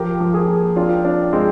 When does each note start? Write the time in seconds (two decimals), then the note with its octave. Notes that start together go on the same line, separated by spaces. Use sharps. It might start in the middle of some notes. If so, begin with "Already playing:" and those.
Already playing: F3 G4 A#4
0.20 F3
0.34 F4 G#4
0.48 A#3
0.76 C4 D4 F4
1.04 C4 D4
1.33 G#3 C4